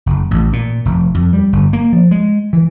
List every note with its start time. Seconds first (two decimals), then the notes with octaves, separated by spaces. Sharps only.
0.06 F#1
0.31 A1
0.53 A#2
0.85 F1
1.14 F2
1.33 G3
1.53 G1
1.73 A#3
1.93 F3
2.11 G#3
2.53 E3